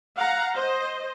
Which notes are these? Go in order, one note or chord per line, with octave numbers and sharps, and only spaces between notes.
F5 F#5 A#5
C5 D#5